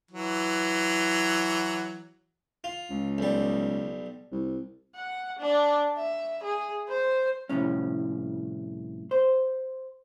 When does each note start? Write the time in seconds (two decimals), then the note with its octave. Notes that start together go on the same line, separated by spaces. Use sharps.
0.11 E3 F#3
2.64 F4
2.90 C#2
3.18 B1 G3
4.31 C2
4.96 F#5
5.39 D4
5.97 E5
6.43 G#4
6.89 C5
7.49 C2 F2 A2 C#4
9.11 C5